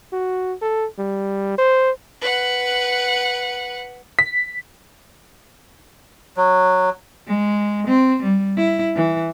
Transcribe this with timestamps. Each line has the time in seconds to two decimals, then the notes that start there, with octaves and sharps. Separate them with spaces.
0.13 F#4
0.62 A4
0.99 G3
1.58 C5
2.22 B4 F#5
4.19 B6
6.37 F#3
7.27 G#3
7.87 C4
8.23 G3
8.57 E4
8.96 E3